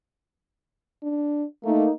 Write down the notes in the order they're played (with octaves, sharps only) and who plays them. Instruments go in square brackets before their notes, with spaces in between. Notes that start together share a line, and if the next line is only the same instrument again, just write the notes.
[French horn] D4
[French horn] A3 [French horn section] A#3 D#4